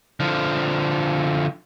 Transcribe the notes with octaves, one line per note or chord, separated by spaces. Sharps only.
D3 F3